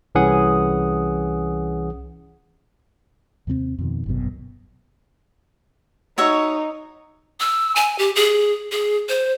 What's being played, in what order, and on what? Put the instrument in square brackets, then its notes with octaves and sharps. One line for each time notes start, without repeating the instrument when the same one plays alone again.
[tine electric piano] C2 E3 C#4 G#4 F#5 D#6
[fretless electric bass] D#2 C3 G#3 C4
F2 B2 D#3
G1 C2 F#2 B2
[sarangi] D#4 [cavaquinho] F#4 C#5 E5
[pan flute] E6
G#5
G4
G#4
G#4
C5